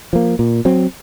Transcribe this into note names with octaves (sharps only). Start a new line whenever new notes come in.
F3 A#3
A#2
F#3 C4